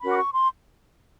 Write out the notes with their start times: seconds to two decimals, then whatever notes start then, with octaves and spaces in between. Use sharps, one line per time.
0.01 C#4 F#4 A#4 B5
0.11 D6
0.17 C#6
0.33 C6